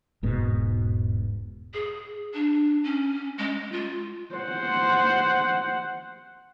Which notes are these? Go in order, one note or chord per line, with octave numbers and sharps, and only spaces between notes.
E1 G#2 B2
G#4
D4
C#4
G#3
F4
C5 F#5